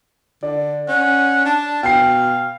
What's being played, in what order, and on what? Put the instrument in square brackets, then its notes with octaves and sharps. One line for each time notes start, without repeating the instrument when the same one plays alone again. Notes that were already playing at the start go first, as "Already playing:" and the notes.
[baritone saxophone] D3 [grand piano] D5
[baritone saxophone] C#4 [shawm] F#5
[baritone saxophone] D4 [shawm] A5
[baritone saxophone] B2 [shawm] F5 [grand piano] G5 C7